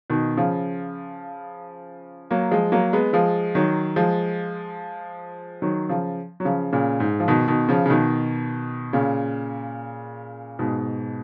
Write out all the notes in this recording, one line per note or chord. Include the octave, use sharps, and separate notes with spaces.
B2 D#3
C#3 F3
F#3 A#3
F3 G#3
F#3 A#3
G#3 B3
F3 G#3
D#3 F#3
F3 G#3
D#3 F#3
C#3 F3
F#3
C#3 F3
A#2 C#3
G#2
F3
B2 D#3
B2 D#3
C#3 F3
C#3
B2 D#3
A#2 C#3
G#2 B2